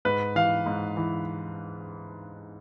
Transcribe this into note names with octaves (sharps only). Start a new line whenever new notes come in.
G#2 B4
E3 F5
G#2
E3